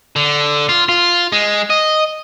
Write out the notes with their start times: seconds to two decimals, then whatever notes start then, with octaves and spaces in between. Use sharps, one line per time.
0.16 D3
0.69 F4
0.89 F4
1.32 G#3
1.70 D#5